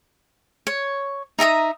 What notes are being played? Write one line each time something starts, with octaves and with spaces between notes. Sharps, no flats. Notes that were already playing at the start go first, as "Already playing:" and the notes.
C#5
D#4 E5 A#5 D#6